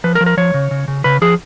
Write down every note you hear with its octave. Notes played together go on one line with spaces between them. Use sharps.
F3 B4
A#4
F3
A#4
F3 C#5
C#3
C#3
C#3
C#3 B4
F3 G#4